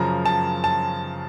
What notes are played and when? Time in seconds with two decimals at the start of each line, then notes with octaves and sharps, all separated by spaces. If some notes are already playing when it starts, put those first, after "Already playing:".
Already playing: F#2 C#3 F3 A#5
0.26 A5
0.64 A5